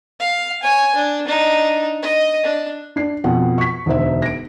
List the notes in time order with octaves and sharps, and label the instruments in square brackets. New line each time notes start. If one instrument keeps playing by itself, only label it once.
[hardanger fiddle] F5
C#5 G#5
D4
D4 D#4
D#5
D4
[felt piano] D4 C7
F2 B2 F#5 G5
C#6 B6
E1 D2 D#4 C5 E5
A#6 D7